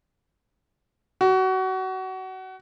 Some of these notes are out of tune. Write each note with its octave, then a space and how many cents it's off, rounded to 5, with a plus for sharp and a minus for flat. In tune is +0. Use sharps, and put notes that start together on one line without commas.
F#4 +25